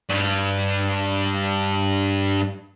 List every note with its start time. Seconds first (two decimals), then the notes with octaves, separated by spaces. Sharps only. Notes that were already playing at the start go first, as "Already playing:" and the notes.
0.10 G2 G3